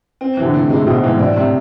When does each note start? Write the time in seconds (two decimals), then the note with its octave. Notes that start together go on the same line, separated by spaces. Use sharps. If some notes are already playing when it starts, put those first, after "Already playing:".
0.21 C4
0.37 C3 E3
0.45 D3
0.54 A2
0.70 C3 G#3
0.82 A2
0.87 B2 C4
1.03 G#2 E3
1.19 A2 D4
1.36 A2 C3